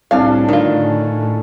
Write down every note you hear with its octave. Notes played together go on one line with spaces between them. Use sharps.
C2 A2 C#4 D4 A4 F5
D3 D#3 F4